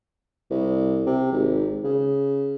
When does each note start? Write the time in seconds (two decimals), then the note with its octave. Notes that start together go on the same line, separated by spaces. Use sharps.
0.50 C2
1.06 C3
1.32 G#1
1.84 C#3